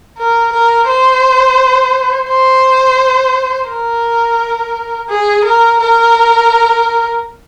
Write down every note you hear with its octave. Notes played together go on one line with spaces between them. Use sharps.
A#4
A#4
C5
C5
A#4
G#4
A#4
A#4